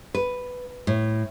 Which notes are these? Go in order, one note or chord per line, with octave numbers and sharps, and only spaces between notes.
B4
A2